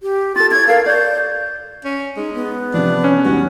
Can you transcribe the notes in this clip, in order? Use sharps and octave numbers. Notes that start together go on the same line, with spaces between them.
G4
F4 A4 A6
E4 C#5 G#6
A4 A#4 F5
C#5 D5 G6
C#4
G#3 D#4
B3
C3 F3 D4
C#4
B1 E2 G3 F#4